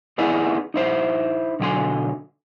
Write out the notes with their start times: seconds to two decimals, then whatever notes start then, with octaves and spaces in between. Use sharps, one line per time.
0.18 B3 D#4 E4 G#4 D5 F#5
0.74 D#4 E4 C5
1.60 B1 D3 F#3 G5 G#5 C6